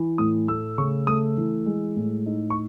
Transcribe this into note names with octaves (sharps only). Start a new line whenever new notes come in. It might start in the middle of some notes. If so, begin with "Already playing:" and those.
Already playing: E3
A2 D#6
A3 E6
C#3 C#6
A3 D#6
E3
G#3
A2
D#4
C#6